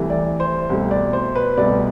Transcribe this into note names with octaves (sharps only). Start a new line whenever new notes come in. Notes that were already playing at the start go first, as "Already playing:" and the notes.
Already playing: C2 C3 E3 A3
D5
C5
C2 B2 A3
D5
C5
B4
C2 B2 A3 D5